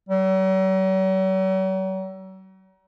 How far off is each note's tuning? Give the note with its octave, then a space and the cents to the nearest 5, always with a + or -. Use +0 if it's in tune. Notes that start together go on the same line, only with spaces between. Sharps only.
F#3 +45